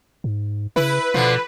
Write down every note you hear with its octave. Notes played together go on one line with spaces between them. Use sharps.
G#2
C#3 E4 B4
B2 D3 F3